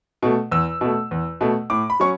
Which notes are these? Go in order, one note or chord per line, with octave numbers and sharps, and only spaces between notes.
B2 A3
E2 E6
B2 A3
E2
B2 A3
A2 D6
B5
F#3 C#4 C#6